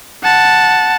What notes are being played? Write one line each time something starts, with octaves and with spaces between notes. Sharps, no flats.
F#5 A5